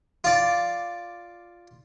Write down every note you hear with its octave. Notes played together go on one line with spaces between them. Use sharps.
F4 D5